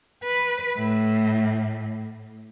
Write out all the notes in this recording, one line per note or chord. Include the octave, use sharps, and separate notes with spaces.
B4
A2